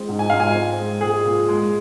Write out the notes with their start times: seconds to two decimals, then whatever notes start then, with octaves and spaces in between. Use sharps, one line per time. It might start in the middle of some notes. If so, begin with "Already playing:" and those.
Already playing: G#3 C4
0.09 G#2
0.19 G#5
0.30 G#2 F5
0.40 G#5
0.54 C4
0.79 G#3
1.01 A#2 G#4
1.25 A#2
1.49 G#3